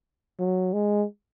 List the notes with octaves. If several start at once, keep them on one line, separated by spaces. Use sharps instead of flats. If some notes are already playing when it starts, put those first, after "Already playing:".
F#3
G#3